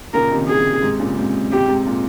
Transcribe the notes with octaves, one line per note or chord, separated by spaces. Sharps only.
A#2 C#3 A#4
C3 D#3
G#4
G#2 C3
A#2 C#3
G#2 C3
G#2 C3 G4
G#2 C3
A#2